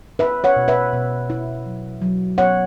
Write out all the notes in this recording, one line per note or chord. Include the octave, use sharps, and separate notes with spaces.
E4 B4 E5
C#5 F#5
B2
B4 E5
B2
E4
F#3
F#3
B3 C#5 F#5